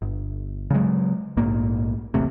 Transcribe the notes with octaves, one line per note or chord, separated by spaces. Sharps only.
G1
C#3 F#3 G#3
A#1 G#2 A#3
D#1 A1 A2 C3